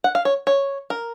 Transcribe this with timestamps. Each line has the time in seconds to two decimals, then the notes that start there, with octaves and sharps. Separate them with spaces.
0.04 F#5
0.15 F5
0.25 C#5
0.47 C#5
0.90 A#4